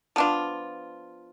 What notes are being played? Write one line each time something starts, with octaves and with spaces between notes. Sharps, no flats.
F3 B3 D4 F4